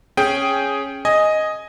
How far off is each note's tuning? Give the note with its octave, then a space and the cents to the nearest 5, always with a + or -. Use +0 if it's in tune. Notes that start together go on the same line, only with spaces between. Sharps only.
C#4 -5 G#4 +0 G5 +0
D#5 +0 G#5 +0